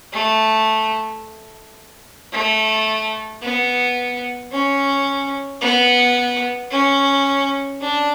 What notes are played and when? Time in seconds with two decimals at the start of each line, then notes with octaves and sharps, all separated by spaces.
0.12 A3
2.32 A3
3.41 B3
4.52 C#4
5.61 B3
6.71 C#4
7.80 D4